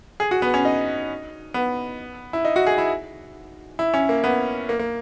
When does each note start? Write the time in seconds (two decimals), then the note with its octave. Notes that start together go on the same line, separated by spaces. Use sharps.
0.20 G#4
0.31 F#4
0.42 B3
0.54 C#4
0.65 D#4
1.54 B3
2.33 E4
2.45 D#4
2.56 F#4
2.67 G#4
2.78 E4
3.79 E4
3.94 C#4
4.09 A#3
4.24 B3
4.69 A#3
4.80 A#3